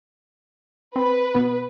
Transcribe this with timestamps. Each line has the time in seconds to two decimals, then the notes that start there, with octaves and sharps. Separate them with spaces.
0.96 C4 B4
1.35 B2 B3